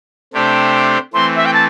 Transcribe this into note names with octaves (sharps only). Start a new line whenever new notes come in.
C3 A3 D4 G4 C5
E3 A3 C4 C6
E5
G5
A5